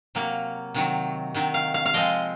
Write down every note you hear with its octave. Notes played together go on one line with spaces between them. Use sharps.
C3 F#3 A#3
C3 D#3 F#3
C3 D#3 F#3
F5
F5
F5
F3 G#3 C4 D#5